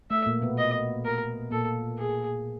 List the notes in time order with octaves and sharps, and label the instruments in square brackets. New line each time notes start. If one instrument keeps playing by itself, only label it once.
[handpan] A3 [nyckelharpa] E5
[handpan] A#2 A#3
B2 B3
[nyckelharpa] D#5
A#4
[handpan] A#2 A#3 [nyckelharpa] A4
[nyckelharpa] G#4